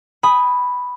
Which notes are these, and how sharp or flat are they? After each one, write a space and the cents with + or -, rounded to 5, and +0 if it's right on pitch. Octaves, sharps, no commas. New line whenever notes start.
G#5 -20 B5 +0 D#6 +0